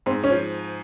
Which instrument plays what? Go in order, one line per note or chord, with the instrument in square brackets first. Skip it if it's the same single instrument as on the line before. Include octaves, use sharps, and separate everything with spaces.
[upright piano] G#2 [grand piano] C4
[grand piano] C#4
[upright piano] F3